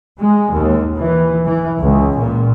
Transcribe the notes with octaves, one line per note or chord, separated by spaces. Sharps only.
G#3
D#2
E3
E3
C#2
A#2